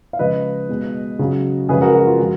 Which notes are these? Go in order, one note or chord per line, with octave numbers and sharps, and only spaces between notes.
F5
C#3 F3 G#3 B4 D#5
B2 G#3
C#3 F#3
C#3 F3 G#3 G#4 B4
F#4 A#4
F#4
F4
F3 G#3 F#4